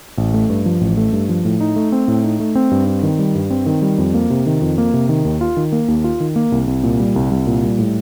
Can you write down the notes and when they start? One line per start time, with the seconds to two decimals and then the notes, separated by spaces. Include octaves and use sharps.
0.18 A1
0.34 A3
0.50 G2
0.66 F3
0.81 A1
0.97 A3
1.13 G2
1.29 F3
1.45 A2
1.60 D#4
1.76 A3
1.92 C4
2.08 A2
2.24 D#4
2.40 A3
2.55 C4
2.71 G2
2.87 C4
3.03 D#3
3.19 G3
3.35 G2
3.51 C4
3.66 D#3
3.82 G3
3.98 F2
4.14 A#3
4.30 C3
4.46 D#3
4.62 F2
4.78 A#3
4.93 C3
5.09 D#3
5.25 D#2
5.41 F4
5.57 D#3
5.72 A#3
5.88 D#2
6.04 F4
6.20 D#3
6.36 A#3
6.52 C2
6.67 C2
6.84 A#2
7.00 G3
7.16 C2
7.31 C2
7.47 A#2
7.63 G3
7.79 A2